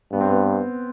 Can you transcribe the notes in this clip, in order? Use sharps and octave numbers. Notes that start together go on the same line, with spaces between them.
G2 B3
C4
B3